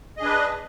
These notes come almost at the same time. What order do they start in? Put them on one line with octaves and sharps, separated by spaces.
D#5 G#4 D4 B4